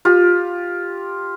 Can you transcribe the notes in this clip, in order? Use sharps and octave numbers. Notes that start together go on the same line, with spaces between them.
F4 G4